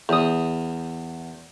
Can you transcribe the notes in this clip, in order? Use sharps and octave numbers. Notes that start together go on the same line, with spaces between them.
E2 D#6